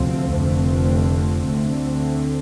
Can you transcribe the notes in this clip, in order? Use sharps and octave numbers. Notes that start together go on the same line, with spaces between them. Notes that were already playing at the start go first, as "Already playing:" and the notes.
Already playing: D2 C3 F3 C4
F1 F2 D3 A3 C4
D2 D3 A3 C4